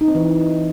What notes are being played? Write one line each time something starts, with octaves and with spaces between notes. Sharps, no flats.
D#4
C4
E3